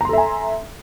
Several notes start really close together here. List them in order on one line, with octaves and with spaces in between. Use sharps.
A#5 C6 A4 E5 G#5